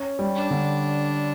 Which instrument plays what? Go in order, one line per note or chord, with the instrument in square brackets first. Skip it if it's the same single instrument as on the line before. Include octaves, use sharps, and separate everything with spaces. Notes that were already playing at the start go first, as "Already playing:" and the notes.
Already playing: [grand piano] C#4
G3
[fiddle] D4
[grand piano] D3